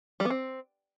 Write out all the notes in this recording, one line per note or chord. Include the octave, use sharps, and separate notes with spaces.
G3
B3
C4